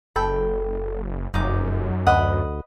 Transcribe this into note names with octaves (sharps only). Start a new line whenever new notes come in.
F#1 A4 G5 B5
F1 F#2 D#4 D6
D2 B4 D#5 F#5